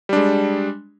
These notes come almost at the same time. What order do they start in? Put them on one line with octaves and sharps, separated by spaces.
G3 D4 G#3